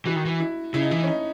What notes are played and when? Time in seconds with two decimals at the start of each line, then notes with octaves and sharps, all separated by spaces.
0.06 E3 F#4
0.16 D#3
0.25 E3
0.40 E4
0.74 C#3 E4
0.82 D#4
0.91 E3 E4
1.03 C#4
1.08 D#4